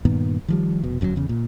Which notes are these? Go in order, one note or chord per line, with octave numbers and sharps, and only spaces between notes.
G2 A#2 D#3 B3
D#3 F3 G3
F1 B2
G1 F#2 B2 F#3
E2 C#3
A#2